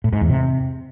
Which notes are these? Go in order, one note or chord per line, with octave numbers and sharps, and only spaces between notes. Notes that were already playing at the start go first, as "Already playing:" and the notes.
A2
G#2
E2
C3